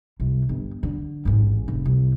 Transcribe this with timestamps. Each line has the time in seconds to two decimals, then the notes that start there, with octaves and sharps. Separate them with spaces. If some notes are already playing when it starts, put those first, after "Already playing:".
0.20 C2
0.49 G1
0.83 D3
1.25 A1 G#2
1.68 F1
1.85 C2